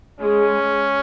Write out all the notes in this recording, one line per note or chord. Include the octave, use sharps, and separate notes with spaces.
G#3 C#4